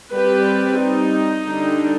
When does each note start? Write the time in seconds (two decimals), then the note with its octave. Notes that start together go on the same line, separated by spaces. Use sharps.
0.13 G3 C4 G4 B4
0.79 D#4
1.46 D3 G3 D4